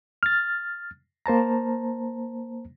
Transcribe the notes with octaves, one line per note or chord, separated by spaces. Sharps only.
F6 A6
A#3 C5 A5 A#5